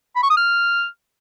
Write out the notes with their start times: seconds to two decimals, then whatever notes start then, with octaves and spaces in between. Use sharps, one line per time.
0.16 B5
0.23 C#6
0.30 D#6
0.37 F6